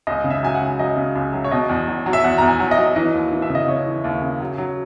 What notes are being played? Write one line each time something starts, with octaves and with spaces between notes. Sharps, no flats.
C#2 D#5
C#3
E5
F#3 G#5
F#5
C#3
F#3 D#5
C#3
C#2
F#3
C#5
B2 D#5
E2
F#3
F#3
E5
E2 F#5
E2 A#5
G#5
F#3
D#5
F#3
E3 D#5
D#2
E3
E5
C#3
D#5
C#3 C#5
E3
D#2
C#3
F#3
F#3